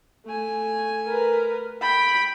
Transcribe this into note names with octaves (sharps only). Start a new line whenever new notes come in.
A3 G#5
A#4 B4
G5 B5